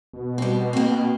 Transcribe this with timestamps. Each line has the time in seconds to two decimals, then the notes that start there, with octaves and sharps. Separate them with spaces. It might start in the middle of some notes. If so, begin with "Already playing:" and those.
0.14 B2
0.38 G3 C4
0.73 A#3 C4